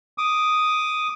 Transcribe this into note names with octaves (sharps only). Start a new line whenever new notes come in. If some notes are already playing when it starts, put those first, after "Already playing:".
D6 D#6